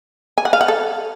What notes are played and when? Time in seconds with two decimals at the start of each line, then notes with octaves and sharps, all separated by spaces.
0.38 G#5
0.45 F#5
0.53 F5
0.61 F#5
0.68 A4